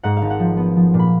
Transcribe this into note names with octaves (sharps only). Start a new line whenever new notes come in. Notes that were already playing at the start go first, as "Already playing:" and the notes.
G#2 F#5
F5
G#1
F#5
F3
B3
F3
A#2
B5